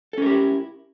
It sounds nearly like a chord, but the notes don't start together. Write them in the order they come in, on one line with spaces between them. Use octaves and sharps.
A4 C#4 A#4 G4 E4